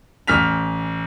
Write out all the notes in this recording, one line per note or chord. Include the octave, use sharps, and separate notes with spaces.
A1 F6 B6 F7